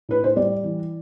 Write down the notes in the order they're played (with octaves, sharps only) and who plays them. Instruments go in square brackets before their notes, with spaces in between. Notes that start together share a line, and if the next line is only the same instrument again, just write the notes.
[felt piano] A2 B4
C5
G3 D5
E3